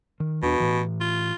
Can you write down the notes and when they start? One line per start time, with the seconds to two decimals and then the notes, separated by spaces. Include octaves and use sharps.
0.20 D#3
0.42 E2 B2 D4
0.60 A2 E3
1.01 F4